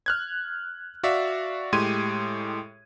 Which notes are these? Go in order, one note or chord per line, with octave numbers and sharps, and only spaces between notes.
F6 F#6 G#6
F#4 D5 E5 F5
A2 G#3 G4 C6 G#6 D#7